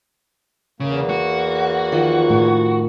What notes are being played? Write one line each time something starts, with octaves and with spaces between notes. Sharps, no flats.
E2 C#3 A#3
F#4
D#3 F3 D#5
A2